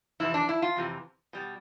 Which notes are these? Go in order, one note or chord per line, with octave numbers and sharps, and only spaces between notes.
F2 C3 E3 E4
D4
E4
F4
F2 C3 E3
B2 G3